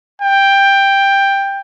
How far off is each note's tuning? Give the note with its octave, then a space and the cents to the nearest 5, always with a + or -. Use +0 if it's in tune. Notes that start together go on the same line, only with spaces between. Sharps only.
G5 +10